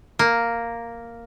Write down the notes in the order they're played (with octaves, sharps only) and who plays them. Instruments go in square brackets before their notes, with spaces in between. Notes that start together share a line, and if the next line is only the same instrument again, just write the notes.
[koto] A#3